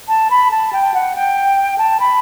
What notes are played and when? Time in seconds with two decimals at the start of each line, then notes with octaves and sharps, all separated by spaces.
0.08 A5
0.30 B5
0.51 A5
0.73 G5
0.94 F#5
1.16 G5
1.78 A5
2.00 B5